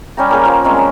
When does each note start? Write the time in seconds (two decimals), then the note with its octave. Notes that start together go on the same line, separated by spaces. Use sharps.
0.17 G3 C#4 G5 A#5
0.31 A#3 G#4 A#4 G#5
0.45 F3 A#3
0.64 G3 G#3 C4 C#4
0.78 D#5